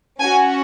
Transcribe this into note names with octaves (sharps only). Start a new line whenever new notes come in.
C#4 F#4 G#5